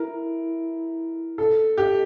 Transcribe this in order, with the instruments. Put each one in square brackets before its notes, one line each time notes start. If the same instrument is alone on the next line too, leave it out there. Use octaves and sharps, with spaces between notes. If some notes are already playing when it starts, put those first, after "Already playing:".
Already playing: [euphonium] E4 [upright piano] A#4
[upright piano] A4
G4